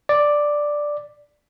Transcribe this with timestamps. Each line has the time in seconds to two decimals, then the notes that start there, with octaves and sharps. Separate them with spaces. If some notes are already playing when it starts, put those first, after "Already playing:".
0.09 D5